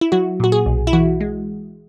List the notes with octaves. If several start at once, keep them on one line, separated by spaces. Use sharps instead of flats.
E4
F#3 F#4
A#2 F#4
G#4
B1
E4
E3 F#4
G#3